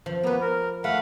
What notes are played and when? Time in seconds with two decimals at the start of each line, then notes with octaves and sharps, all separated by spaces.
0.06 F3
0.23 A#3 B3 B4
0.41 A#4
0.84 A3 F5 F#5 B5